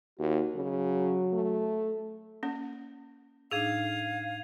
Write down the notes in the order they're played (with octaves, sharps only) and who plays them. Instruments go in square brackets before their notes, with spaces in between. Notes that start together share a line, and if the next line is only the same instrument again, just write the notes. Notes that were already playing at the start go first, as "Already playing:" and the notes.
[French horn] D#2 [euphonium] F#4
[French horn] C#3 [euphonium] F#3
[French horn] A3
[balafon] A#3 C#4
[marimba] A2 D4 D#4 [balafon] G#4 [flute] F5 [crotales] G#6 D#7 F7